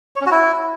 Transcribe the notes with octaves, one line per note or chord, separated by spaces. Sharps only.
C#5
C#4
F#4
E4